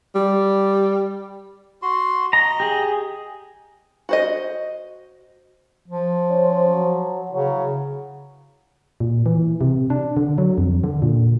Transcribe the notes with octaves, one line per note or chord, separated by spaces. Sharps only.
G3
F#4 C6
D#5 A#5
G4 G#4
F#4 C5 D#5
F3
C#4 C5
F#3
C#3 E3 F#3
A#2
E3
C3
D4
D3
F#3
F2
D3
A#2